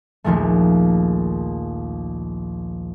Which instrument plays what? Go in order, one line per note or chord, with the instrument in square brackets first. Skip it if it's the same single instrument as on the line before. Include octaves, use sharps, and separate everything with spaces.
[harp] A#1 D#2 F3 G#3 A3